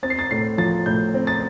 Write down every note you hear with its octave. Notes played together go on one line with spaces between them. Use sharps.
C4 A6
C7
A6
A2 C7
F3 A6
A2 G6
C4
A6